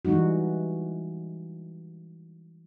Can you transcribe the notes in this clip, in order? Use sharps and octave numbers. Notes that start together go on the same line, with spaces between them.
E3 G3 G#3 D#4 F#4